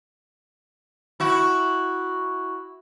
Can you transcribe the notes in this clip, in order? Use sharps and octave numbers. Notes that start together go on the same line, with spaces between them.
E4 F#4